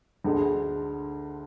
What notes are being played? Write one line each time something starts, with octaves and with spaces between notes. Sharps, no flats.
D2 D3 G#3